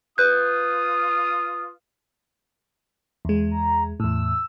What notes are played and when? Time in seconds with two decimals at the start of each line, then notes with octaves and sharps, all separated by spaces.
0.18 F4 B4 D#6 F#6 G6
3.25 E2 G#3
3.51 A#5
4.00 E2 A2 E6